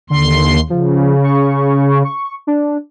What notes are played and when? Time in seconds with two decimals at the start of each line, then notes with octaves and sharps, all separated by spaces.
0.10 D#2 D3 C6
0.70 C#3 F3
1.24 C#6
2.05 C#6
2.47 D4